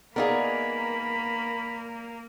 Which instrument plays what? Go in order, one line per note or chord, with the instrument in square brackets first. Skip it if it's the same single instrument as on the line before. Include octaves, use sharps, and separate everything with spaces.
[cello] A#3 [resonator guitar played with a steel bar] B3 D#4 G#4 [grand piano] A#4 D5 F5 [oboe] B5